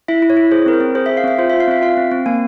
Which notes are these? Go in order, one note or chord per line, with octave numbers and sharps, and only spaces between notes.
E4 E5
E4
C#5
E4
G#4 C5
C4 A#4
C5
C4
G#4 C5
G#4 E5
F5
C4 E5
F4 C5
F4 E5
F5
C4 E5
F4 F5
C4
C4
A#3 G#5